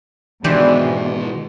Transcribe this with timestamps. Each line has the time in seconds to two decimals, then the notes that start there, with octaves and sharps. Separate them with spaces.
0.44 B2 D#3 E3 G#3 D4 G4 C5